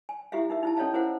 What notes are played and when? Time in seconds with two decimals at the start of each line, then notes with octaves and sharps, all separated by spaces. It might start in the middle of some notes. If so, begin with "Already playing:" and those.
0.09 G#5
0.32 E4 G4 G#4 E5 F5
0.50 D#4 A#4 E5
0.63 D#4 E4 A5
0.77 C#4 A4 C#5 D#5 F5 A5
0.94 E4 G#4 A#4 C5 F5 F#5